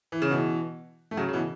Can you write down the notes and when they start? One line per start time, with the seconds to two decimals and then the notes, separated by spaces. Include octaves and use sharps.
0.12 E3
0.22 C#3
0.31 B2 E3
1.11 A3
1.17 C#3 F#3
1.29 C#3
1.33 B2 E3